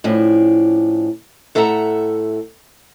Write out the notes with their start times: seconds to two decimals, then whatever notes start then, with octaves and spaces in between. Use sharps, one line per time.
0.04 A2 F3 C#4 D4
1.55 A2 A4 E5 F#5 A5 A#5